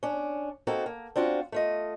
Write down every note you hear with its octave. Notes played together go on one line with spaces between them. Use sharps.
C#4 D4
A#3 C4 D#4 F#4 A4
A#3
C4 D4 F4 F#4
A3 F4 D#5